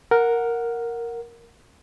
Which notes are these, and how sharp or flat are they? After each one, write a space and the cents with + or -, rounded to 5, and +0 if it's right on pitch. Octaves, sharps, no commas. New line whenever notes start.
A#4 +0 F#5 -10